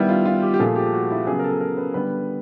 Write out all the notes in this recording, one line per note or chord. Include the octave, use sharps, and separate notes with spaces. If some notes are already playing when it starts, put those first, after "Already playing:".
Already playing: D#3 G3 B3 E4
F4
F4
G4
G4
A#2 F3 A3 G#4
G4
F#4
E4
C#3 F#3 B3 G#4
A#4
A4
A#4
B4
D3 G3 B3 B4